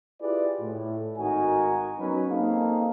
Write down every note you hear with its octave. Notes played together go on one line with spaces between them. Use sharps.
E4 F4 G4 G#4 B4 D5
A2
G#1 D#4 F#4 A#4 G#5
F#3 B3 C#4 D#4 B4
A#3 C4 D#4 G#4 A4 F5